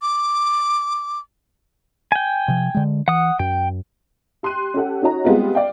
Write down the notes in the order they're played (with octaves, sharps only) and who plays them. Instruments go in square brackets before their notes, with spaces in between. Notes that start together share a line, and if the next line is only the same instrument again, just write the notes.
[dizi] D6
[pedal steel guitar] G5 G#5
[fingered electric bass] C3 F3
D3 G#3
[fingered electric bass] E3 [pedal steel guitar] F#5 D#6
[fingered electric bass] F#2 [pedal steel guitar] G5
[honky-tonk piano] G4 C6 F#6 D#7
C#4 G4 A4 F#5
C#4 D#4 F#4 C#5 A#5
G3 G#3 B3 C4 F4 G4
D5 F5 G5